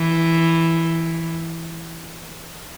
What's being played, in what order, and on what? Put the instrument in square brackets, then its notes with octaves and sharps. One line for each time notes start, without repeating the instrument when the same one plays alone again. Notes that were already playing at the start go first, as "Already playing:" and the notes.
Already playing: [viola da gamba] E3